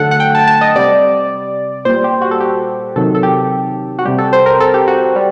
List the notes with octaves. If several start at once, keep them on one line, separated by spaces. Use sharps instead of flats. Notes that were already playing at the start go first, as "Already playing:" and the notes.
Already playing: D3 F#3 A3 A4 F#5
F#5
G5
A5
A5
D#5
C3 G3 D5
A#2 G3 C5
G4
F#4
A4
G4
C3 D#3 F#3 A4
A4
G4
F#4
C3 G3 G4
A4
C5
A#4
A4
G4
F#4
G3